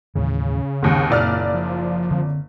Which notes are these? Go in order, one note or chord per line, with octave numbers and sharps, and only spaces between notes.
D#2 A2 C#3 E3
D#2 G#2 C4
F#1 A#2 D5 F6
F3
D3 C4